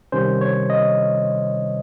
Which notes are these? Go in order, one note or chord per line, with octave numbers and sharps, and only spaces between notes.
C3 D#3 G3 C#4 C5
C#5
D#5